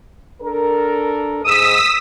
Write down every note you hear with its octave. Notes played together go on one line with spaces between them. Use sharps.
D4 A4 A#4
G#2 D#6 E6 B6